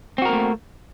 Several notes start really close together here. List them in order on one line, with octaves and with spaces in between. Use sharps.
C4 F#4 A#4 A#3 A3